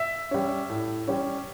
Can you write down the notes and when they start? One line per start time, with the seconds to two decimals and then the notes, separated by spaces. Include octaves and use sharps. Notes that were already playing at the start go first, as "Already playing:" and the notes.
Already playing: E5
0.31 G3 C#4
0.69 A2
1.08 G3 C#4